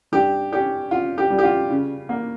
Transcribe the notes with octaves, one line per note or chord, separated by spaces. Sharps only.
G2 G4
C#4 G4
F4
G4
G3
G4
F4
C#3
A#3